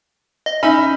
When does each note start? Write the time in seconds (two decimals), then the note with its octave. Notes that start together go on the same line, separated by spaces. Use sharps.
0.46 D#5
0.63 C#4 D#4 E5 B5